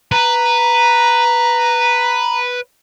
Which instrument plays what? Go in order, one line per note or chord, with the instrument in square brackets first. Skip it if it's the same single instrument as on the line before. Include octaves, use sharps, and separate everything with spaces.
[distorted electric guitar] B4 [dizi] A#5